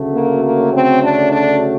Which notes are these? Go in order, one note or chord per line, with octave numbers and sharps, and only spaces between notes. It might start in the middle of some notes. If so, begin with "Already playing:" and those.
Already playing: D2 C#3 F#3 A3
A#3
A#3
C4
D4
D4